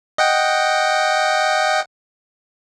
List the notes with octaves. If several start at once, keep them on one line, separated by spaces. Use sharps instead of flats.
D#5 F#5 G5